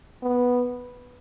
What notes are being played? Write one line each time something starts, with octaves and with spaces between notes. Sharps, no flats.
B3